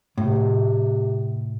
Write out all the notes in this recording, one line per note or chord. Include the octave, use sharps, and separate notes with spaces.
A2 C3